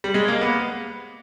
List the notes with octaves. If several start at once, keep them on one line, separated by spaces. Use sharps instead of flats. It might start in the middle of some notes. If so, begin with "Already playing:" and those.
G3
G#3
A#3
B3